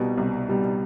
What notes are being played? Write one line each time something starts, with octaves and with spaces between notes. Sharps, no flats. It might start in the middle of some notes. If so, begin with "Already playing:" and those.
Already playing: C2 B2 G3
C2
B2 G3